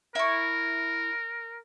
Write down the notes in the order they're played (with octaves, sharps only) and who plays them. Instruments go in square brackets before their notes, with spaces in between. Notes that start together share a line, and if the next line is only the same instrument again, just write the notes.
[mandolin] E4 C#6 [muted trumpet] A#4